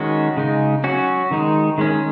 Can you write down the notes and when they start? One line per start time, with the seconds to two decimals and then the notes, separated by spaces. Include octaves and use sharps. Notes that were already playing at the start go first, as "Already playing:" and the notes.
Already playing: D#3 G#3 C#4 F#4
0.37 C#3 G#3 D#4
0.84 F#3 C#4 F#4
1.31 D#3 G#3 D#4
1.78 D#3 G#3 C#4